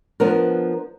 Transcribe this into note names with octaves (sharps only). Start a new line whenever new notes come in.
F3 B3 D4 A#4